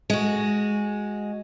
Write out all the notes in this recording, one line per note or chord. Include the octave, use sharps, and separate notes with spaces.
G#3 F#4